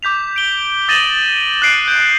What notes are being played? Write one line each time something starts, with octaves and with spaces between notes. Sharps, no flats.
D6 G6 B6 F7
D7 G7
D#6 A6 A#6 D#7 E7 F#7
F#6 A6 C7 D7
G6